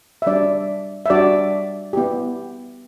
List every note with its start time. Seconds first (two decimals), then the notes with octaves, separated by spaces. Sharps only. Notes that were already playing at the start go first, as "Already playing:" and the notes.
0.22 E5
0.26 G3 D4 F#4 D5
1.06 E5
1.10 G3 D4 F#4 D5
1.93 B3 E4 G4